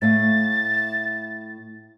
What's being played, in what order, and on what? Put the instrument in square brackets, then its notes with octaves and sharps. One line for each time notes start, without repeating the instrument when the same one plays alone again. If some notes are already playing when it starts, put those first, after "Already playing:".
[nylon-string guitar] A2 A3 F5 [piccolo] A6